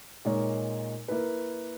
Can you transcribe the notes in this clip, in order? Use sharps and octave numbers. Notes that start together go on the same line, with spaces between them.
A#2 G#3 D#4 A#4 C#5
A#3 E4 B4